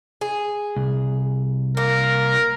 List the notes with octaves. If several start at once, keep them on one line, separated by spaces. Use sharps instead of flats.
G#4
C2
A#3 A#4